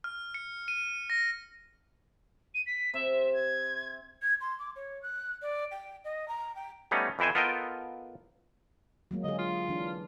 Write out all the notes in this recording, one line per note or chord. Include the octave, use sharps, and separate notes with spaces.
F6
C#7
D#7
A#6
D#7
B6
C3 E5
G#6
G#6
C6
D6
C#5
F#6
D5
G5
D#5
A#5
G5
G3 A3 B3 C#4 D#4
F2 E3 E4 C5 G#5
B3 F4 A4 A#4 D#5 G5
F#3 G#3 A#3
D3 G#4 D#5
F4
E3 D4